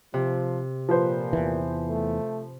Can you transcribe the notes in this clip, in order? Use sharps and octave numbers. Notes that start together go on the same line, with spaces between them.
C3 F3
A#2 F3 B4 C5
E2 E3
A3